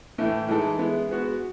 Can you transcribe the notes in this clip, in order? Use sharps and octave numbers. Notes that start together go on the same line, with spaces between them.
A2 E3 A3
E3 G#3 D#4 A4
G#3 B3 E4
G#3 B3 F#4